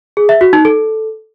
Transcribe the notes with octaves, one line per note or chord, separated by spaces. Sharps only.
G#4
E5
F#4
D#4
A4